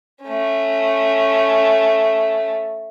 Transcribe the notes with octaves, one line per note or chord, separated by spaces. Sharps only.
A3 C#4